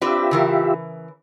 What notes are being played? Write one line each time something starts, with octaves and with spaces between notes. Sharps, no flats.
C4 D4 F4 G4 B4 E5
C#3 E3 A#4